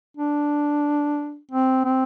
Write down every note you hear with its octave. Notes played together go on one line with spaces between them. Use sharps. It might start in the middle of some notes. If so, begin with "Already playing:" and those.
D4
C4
C4